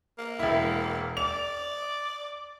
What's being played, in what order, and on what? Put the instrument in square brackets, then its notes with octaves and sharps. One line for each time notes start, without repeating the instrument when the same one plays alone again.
[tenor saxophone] A#3
[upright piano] E1 E4
[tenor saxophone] D5 [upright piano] F7